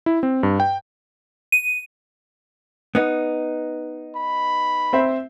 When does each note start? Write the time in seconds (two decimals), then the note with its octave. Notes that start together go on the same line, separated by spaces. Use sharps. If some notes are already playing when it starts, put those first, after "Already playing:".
0.06 E4
0.23 C4
0.43 G2
0.60 G5
1.52 D#7
2.95 B3 D#4
4.16 B5
4.93 C4 C5 E5